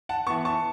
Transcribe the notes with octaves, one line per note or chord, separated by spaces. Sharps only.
F#5 A5
E3 B3 A5 C#6
A5 C#6